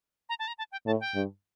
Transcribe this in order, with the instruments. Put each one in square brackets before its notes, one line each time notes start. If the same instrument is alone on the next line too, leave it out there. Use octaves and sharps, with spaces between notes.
[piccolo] A#5
A5
A#5
A5
G5
[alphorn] A2 [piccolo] A5
[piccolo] G5
[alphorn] G2